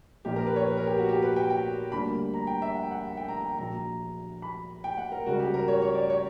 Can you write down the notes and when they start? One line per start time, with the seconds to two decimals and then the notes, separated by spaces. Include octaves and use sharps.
0.25 A#1 A#2 A#3 G4
0.36 A#4
0.47 B4
0.56 C#5
0.68 B4
0.77 A#4
0.87 G4
0.98 F#4
1.09 G4
1.22 B4
1.36 G5
1.50 G5
1.92 D2 D3 G3 A#3 B5
2.34 A#5
2.47 G5
2.62 E5
2.75 F#5
2.83 G5
2.91 F#5
3.17 G5
3.28 A#5
3.41 G5
3.58 A#1 A#2 F#3 A#5
4.42 B5
4.84 G5
4.97 F#5
5.12 A#4
5.26 C#2 C#3 G3 F#4
5.39 G4
5.54 A#4
5.68 C#5
5.82 C#5
5.95 D5
6.10 C#5